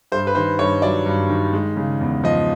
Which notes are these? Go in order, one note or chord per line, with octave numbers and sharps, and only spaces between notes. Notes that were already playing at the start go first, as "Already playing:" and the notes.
G2 C5
B4
D#3 C5
G2 C#5
F#3 D5
G2
D#3
G#3
C#3
E2
F3 D#5